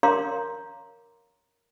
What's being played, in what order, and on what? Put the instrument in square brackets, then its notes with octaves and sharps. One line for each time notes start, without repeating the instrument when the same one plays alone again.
[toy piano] A#4 C#5 F5 A#5 C6 D6